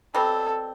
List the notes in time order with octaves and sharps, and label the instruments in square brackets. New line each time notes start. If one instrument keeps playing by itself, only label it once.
[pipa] B2 G3 C4 [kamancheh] A4